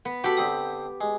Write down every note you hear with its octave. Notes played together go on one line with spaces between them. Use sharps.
B3
F#4 G4 A4 B5
D3 C4 D#6
G#3